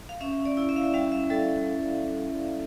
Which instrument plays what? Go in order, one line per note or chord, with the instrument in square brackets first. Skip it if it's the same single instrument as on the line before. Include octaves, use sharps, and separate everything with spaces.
[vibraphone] F5
C#4 E5
D5
E4
E5
F5
E5
G3 F5
E5
G3 A4